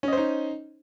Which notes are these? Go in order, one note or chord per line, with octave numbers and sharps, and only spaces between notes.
C#4 D#4 C5 D#5